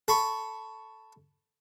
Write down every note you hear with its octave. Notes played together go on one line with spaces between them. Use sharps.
A4 B5 C#6